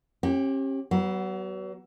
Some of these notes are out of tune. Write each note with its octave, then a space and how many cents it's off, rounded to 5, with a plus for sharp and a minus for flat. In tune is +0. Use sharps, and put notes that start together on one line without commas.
C#4 -40 G4 +0
F#3 +40 B3 +0